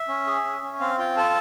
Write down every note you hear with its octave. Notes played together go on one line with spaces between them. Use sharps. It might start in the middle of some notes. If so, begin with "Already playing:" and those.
Already playing: E5
C#4
G#4
C#4
C#4
C4 F5
F4 G5
A4 A5